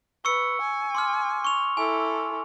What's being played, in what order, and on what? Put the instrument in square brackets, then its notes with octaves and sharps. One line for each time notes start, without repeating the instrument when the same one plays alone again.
[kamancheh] B4 [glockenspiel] C#6 E6 C#7
[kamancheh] G#5
[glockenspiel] C6 D6 F6
C#6 F7
[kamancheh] E4 A4 [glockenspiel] G#5